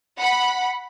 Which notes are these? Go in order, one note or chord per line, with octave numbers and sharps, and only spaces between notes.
F#5 B5